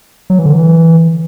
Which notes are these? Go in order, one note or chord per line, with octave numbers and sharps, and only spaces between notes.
F#3
E3
D3
E3